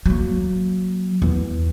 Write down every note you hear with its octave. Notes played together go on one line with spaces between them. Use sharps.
F#3 A#3
E2